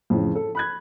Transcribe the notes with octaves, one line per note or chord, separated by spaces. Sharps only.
F2 A2 C#3 E3
A4
B5 F#6 G#6